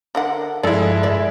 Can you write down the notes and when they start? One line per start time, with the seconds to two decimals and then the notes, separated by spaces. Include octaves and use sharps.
0.15 D3 A#4 F#5
0.63 G2 F3 G#3 E4 A4 D5
1.03 D5 E5